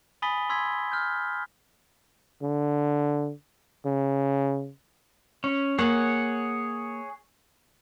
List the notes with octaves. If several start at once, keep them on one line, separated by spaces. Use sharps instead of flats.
G#5 B5 D#6 A6 B6 G7
B5 C6 E6 G#6 B6
F6 G6
D3
C#3
C#4
A#3 G#4 C#5 F#5